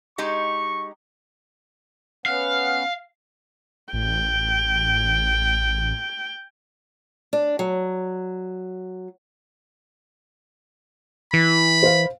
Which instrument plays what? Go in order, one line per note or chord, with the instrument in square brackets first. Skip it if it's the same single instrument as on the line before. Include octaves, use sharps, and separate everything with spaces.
[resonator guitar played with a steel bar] G#3 D#4 G4 [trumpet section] C#6
[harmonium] B3 C#4 F#5 [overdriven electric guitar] F5
[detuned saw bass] A1 [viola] G5
[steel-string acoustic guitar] D4
F#3
[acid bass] E3 [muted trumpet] B5
[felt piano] C5 F5